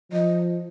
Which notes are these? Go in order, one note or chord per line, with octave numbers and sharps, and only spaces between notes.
F3 D#5